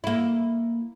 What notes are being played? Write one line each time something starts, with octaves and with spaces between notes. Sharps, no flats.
A#3 E4